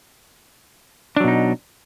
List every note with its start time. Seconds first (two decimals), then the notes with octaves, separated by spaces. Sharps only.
1.16 D4
1.20 F#3
1.24 B2
1.28 D#4